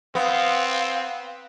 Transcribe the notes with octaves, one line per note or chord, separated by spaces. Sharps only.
B3 C4 F5